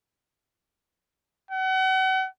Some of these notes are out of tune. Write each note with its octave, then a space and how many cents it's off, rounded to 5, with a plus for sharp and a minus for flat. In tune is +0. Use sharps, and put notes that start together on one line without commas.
F#5 +35